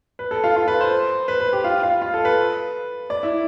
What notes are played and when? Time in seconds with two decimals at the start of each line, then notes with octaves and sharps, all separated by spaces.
0.19 B4
0.31 A4
0.44 F4
0.56 F4
0.68 B4
0.81 C5
1.28 B4
1.40 B4
1.53 G4
1.64 F4
1.83 F4
2.02 F4
2.14 A4
2.25 B4
3.10 D5
3.23 E4